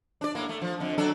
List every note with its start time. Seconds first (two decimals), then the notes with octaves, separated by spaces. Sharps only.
0.21 D4 D5
0.35 A2 A#3
0.49 A3
0.62 F3
0.80 F2 D3
0.98 F#3 D4 A4